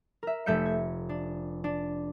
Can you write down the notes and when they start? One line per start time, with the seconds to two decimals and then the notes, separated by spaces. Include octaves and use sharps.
0.23 A#4 E5
0.46 F1 A3 E5 G6 C#7
0.66 G#6
1.09 D4
1.64 D4